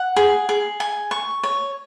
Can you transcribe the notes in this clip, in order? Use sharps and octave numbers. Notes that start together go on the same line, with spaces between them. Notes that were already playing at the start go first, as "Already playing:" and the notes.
Already playing: F#5
G#4
G#4
G#5
C#6
C#5